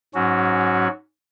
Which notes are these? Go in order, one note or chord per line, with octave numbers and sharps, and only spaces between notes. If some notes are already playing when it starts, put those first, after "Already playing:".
G#2 F#3 C#4 F#4